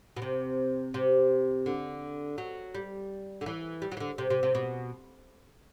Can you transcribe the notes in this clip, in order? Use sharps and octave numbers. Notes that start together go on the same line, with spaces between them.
B2
C3
C3
D3
F#3
G3
D3
E3
G3
F#3
E3
D3
C3
C3
C3
B2